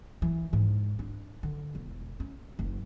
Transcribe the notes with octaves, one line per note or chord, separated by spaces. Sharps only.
E3
G#2
D4
D3
E1
C#4
F#1